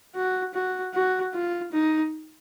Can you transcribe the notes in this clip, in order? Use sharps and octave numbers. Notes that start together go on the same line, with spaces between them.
F#4
F#4
F#4
F4
D#4